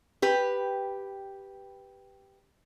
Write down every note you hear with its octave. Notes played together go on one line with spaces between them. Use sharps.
G4 B4